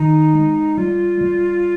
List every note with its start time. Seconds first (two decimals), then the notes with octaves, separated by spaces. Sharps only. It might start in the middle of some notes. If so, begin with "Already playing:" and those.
Already playing: D#3 D#4
0.34 G#3
0.77 G3 F4
1.21 G3